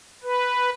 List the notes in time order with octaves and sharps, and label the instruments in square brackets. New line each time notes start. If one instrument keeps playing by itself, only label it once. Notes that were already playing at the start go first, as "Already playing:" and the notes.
[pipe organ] B4